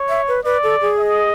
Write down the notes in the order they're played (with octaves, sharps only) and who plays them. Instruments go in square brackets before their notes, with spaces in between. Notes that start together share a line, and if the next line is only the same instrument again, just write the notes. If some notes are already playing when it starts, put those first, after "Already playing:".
Already playing: [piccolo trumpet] C#5
[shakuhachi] E5
B4
[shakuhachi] B4 [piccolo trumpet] D5
[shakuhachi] A4
G#4
[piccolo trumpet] D#5